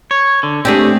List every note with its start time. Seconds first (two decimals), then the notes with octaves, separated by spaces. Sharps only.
0.11 C#5
0.43 D3
0.65 A3 C4 D4 G4 G#4